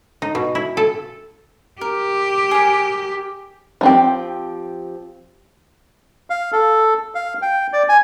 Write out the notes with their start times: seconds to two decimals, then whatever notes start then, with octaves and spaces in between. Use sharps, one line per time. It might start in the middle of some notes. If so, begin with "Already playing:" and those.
0.22 D#4
0.35 B2
0.55 E4
0.77 A4
1.81 G4 A#4
2.51 G#4 A#4
3.81 F3 C4 G4
6.30 F5
6.52 A4
7.15 F5
7.42 G5
7.73 D5
7.89 G#5